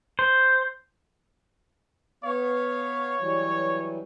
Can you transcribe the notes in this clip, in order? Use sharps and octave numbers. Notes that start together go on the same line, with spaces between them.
C5
B3 C#5 F5
E3 F#3 G3